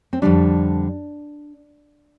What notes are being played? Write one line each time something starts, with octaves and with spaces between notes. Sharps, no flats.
C4
F2 D3 G3 D4